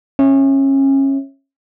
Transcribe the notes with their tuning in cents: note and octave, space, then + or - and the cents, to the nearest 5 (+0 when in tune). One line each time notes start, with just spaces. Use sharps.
C#4 -25 E5 +0